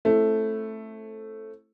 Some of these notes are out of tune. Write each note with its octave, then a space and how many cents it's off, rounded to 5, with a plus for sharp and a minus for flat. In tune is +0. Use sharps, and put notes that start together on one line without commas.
A3 +0 C4 +35 E4 +0